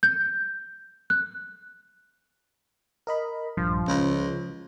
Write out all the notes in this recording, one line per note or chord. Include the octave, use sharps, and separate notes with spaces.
G6
F#6
A#4 D#5 B5
A#1 G2 F3
C#2 C#3